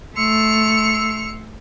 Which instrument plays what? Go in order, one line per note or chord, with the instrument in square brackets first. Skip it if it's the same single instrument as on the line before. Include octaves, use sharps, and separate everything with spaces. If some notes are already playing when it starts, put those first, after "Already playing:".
[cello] A3 [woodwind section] C6 E6 [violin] C#7 F7